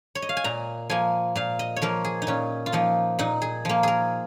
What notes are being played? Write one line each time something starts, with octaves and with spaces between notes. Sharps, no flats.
C#5
D#5
F5
G#5
A#2 A#5
F3 A#3 G#5
A#2 F5
D#5
C#5
F3 A#3 A#4
G#4
D#4
A#2 C#4
F4
F3 A#3 D#4
A#2 D#4
G#4
F3 A#3
G#4 A#4